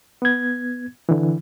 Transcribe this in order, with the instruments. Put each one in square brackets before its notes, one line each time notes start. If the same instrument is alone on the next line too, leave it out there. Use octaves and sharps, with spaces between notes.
[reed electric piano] B3 G#6
D3 E3